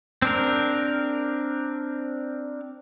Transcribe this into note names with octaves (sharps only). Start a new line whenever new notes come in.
C4 D4 A#4